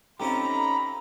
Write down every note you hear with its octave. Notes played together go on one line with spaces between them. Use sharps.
A3 C4 C#4 D#4 F4 G4 A#5 B5